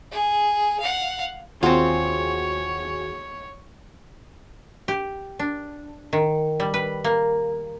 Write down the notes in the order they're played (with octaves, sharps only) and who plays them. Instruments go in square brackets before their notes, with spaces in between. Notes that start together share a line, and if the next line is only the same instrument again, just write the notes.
[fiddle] G#4
F5 F#5
[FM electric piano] D#2 F#4 G#4 [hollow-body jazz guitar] C4 F4 [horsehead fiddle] C#5
[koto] G4
D4
D#3
G3
B4
A#3